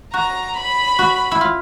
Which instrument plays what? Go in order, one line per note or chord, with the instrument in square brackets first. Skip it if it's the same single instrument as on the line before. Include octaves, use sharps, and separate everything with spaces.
[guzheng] F#4 [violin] A#5
[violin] B5
[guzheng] F#4
E4
F4